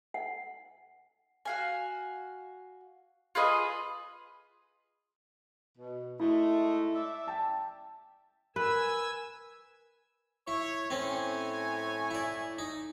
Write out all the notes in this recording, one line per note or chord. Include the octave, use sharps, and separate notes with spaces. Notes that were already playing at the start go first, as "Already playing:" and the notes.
F#5
F#4 F5 G#5
F4 G#4 B4 D#5
B2
G#2 G#3 A3 E4
D5 E5
G5 A5
A#4 B4 G#5 E6
E4 C#5
A2 C4 C#4 C#5 G#5
E4 D5
D#4